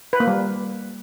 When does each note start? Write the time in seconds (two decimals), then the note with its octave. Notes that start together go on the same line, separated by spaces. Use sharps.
0.13 B4
0.20 A#3
0.27 G3